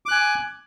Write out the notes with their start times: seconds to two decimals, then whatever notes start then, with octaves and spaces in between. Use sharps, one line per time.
0.06 D6
0.08 F#6
0.11 G#5